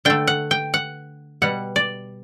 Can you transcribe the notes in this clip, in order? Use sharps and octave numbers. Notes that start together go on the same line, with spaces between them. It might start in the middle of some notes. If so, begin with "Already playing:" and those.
D3 A3 G5
F#5
G5
F#5
B2 G3 F#5
D5